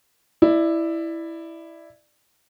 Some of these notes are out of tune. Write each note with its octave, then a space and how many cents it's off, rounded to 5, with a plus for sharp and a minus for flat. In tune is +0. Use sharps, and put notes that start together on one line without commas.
E4 +0 D5 +20